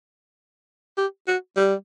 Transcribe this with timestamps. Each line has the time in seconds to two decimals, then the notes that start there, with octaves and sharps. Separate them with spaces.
0.97 G4
1.27 F#4
1.56 G3